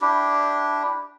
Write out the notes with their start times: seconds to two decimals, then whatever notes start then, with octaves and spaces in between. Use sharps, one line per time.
0.01 D4 E4 G4